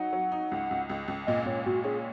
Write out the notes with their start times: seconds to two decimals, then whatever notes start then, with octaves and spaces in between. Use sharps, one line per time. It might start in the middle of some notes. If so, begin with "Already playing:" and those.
Already playing: F#3 D#4 F#5
0.13 F#3
0.32 D#4
0.52 C#2
0.71 C#2
0.89 C#2
1.08 C#2
1.27 A#2 D#5
1.46 A#2 C#5
1.66 A#2 F#4
1.84 C#4 G#4